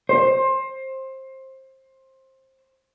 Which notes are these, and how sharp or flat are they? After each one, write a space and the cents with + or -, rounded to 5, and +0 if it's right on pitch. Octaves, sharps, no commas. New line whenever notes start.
C5 +20